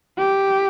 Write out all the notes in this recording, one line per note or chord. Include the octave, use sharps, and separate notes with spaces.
G4